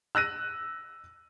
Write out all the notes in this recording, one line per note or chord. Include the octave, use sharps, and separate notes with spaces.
E6 F#6 A#6 D#7